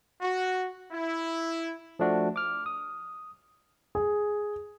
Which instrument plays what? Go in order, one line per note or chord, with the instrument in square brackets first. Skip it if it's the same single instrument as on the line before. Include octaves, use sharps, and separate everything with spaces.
[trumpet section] F#4
E4
[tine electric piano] F3 A3 D4 F#4
D6 F6
D#6
[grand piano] G#4